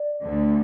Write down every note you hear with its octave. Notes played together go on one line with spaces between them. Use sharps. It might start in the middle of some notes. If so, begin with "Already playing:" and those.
Already playing: D5
D2 D3 A3